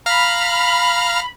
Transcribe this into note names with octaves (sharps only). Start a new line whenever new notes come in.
F5 A#5 B5 F6